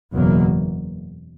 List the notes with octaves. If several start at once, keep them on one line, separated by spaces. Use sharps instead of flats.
F#1 E2 B2 F#3 A#3